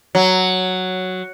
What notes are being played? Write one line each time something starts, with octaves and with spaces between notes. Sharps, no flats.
F#3